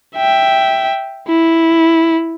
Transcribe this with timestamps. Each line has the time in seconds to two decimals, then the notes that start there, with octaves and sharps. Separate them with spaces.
0.17 E5 G5
1.28 E4